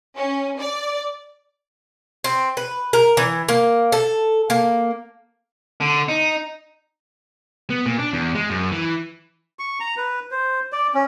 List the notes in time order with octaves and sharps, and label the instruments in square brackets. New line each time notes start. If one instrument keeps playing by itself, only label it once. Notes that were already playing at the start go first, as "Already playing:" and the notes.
[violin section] C#4
D5
[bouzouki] C4
B4
A#4
E3
A#3
A4
A#3
[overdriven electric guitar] D3
D#4
[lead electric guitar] B3
A#2
D4
E2
G#3
F#2
E3
[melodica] C#6
A#5
B4
C5
D5
C#4